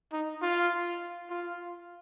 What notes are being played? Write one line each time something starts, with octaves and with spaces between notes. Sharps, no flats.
D#4
F4
F4